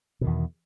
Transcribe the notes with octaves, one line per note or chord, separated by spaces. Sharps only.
E2 B2 D#3